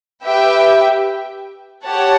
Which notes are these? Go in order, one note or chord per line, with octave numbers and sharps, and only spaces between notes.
G4 B4 E5 G5
G4 C#5 F#5 A5